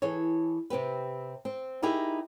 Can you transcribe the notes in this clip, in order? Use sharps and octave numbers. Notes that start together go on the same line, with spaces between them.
E3 G#4 A4 C#5
C3 C4 G4 B4
C4
D#4 E4 G4 G#4 A#4